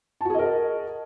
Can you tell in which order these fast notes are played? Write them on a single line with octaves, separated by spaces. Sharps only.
A5 F#4 G#4 D#5 A#4